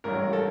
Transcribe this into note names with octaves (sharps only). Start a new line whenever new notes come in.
A1 G2 F#3 A#4
A4